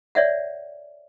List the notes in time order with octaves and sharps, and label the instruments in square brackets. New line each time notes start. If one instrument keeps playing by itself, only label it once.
[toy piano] C#5 D5 E5 F#5